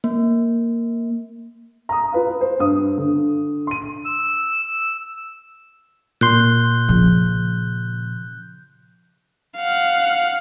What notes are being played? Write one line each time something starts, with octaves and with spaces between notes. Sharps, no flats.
A#3
A#5 D#6
F4 B4 F5
C5
G2 D#6
D3
C6 D#7
E6
A#2 C6 F#6 G6 G7
C#3 F3
F5 F#5